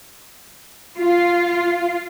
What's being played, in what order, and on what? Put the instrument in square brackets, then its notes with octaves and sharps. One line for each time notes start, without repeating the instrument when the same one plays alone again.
[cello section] F4